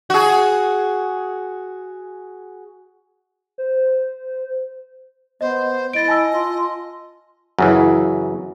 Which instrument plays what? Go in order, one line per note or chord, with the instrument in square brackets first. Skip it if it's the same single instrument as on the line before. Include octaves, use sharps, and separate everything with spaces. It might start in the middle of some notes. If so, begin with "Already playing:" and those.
[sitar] F#4 G#4
[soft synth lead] C5
[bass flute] B3 [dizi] C5 [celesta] D#5
[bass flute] E4 [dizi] D#5 [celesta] A6 D7
[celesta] G#5 A5 E6
[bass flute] F4
[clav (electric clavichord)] F#2 C#3 E3